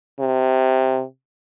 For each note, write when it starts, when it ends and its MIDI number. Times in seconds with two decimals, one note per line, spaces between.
0.19 1.02 48